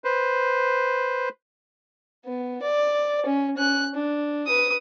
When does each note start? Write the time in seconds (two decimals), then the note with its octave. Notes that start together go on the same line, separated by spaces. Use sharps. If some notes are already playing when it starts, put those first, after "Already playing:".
0.04 B4 C5
2.25 B3
2.62 D5
3.26 C#4
3.57 C#4 F#6
3.94 D4
4.46 B4 D#6